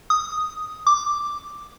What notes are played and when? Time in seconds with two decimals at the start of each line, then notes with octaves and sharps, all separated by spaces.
0.10 D#6
0.87 D6